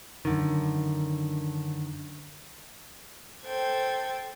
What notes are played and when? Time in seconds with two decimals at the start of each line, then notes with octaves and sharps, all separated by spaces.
0.25 F#2 D3 D#3
3.46 A4 C5 G5 G#6